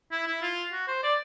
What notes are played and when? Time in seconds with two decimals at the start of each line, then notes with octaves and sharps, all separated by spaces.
0.12 E4
0.27 E4
0.42 F4
0.72 F#4
0.88 C5
1.03 D5